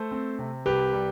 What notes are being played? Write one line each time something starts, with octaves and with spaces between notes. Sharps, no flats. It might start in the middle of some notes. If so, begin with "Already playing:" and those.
Already playing: A3 A4 C5
C4
C3
C2 G4 B4
G3